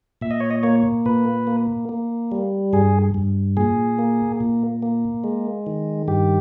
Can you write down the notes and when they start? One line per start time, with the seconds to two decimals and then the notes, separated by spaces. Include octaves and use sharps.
0.21 A#2 E5
0.31 D#5
0.40 C#5
0.51 D#5
0.63 A#3 C#5
1.06 A#2 B4
1.47 A#3
1.89 A#3
2.32 G3
2.73 G2 G#4
3.14 G2
3.57 A#2 G#4
3.99 A#3
4.40 A#2
4.83 A#3
5.24 G#3
5.67 D#3
6.08 G2 G4